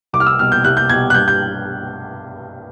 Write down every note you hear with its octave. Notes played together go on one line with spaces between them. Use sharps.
C2 D6
F6
E6
B2 G3 F6
G6
C2 F#6
G6
B2 G3 G#6
F#6
G2 G6
G6